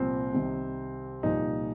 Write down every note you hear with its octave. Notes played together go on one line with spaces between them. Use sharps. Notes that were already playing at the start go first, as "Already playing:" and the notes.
Already playing: C2 A#2 F3 C4
C2 C3 D#3
C2 A#2 F3 D#4